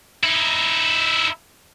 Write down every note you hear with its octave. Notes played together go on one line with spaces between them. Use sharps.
D#4 E4